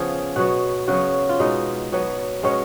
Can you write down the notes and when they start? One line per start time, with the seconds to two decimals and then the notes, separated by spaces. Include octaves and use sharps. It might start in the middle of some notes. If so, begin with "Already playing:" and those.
Already playing: C#3 F3 B3 G#4
0.36 B2 F#3 B3 F#4
0.88 C#3 F#3 B3 F#4
1.29 F4
1.39 B2 G#3 B3 D#4
1.92 B2 F#3 B3
2.43 B2 G#3 B3 C#4